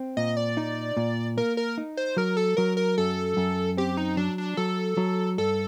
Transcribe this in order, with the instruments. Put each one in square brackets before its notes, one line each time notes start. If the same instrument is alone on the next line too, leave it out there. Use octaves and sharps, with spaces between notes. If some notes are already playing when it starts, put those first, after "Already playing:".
Already playing: [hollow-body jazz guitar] C4
[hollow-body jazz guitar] A#2 [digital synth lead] D#5
[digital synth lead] D5
[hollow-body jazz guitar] D#4
A#2
[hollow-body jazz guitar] A#3 [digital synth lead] A#4
[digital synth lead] A#4
[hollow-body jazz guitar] D#4
[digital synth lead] C5
[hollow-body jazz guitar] F#3 [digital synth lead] A#4
[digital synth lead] A4
[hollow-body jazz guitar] F#3 [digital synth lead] A#4
[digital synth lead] A#4
[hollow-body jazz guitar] F#2 [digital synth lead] A4
[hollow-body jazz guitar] F#2
[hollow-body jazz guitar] C4 [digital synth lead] G4
[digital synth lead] D#4
[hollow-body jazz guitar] F#3 [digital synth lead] D4
[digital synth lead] D4
[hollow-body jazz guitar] F#3 [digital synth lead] A4
[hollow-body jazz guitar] F#3
[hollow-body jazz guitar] G2 [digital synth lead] A4